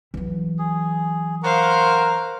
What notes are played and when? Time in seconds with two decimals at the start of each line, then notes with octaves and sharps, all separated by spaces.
0.14 E3 F#3
0.59 G#4
1.43 A#4 C5 F5 F#5 C#6